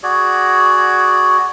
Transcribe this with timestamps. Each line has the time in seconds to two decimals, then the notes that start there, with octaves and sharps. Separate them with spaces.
0.03 F#4 G#4 D5